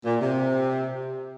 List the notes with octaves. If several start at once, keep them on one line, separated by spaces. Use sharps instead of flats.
A#2
C3